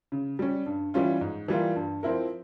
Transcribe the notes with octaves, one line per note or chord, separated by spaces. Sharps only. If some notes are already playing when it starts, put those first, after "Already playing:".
C#3
G3 C#4
G2
E3 G3 C#4 F4
G#2
E3 G3 A#3 F4
G2
F3 C4 E4 A#4